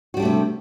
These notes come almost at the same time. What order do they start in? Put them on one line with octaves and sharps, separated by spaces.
F#4 G3 D4 A3 C3